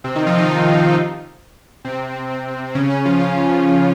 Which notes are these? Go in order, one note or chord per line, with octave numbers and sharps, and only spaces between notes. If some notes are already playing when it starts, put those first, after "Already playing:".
C3 C4
D#3 D#4
F3 F4
D#3 D#4
C3 C4
C#3 C#4
C#3 C#4
F3 F4
F3 F4